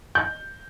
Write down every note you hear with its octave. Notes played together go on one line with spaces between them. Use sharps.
G6